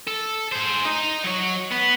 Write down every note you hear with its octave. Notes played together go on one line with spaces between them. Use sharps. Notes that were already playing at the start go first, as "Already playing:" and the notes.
A4
G#4 C5
D#4 D#5
F#3 C#5
B3